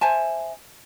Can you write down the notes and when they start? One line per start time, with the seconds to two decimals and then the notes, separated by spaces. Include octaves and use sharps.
0.01 C5 E5 G#5 A5